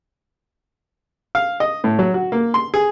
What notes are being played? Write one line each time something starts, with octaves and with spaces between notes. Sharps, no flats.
F5
D#5
A2
F#3
F#4
A#3
C6
G#4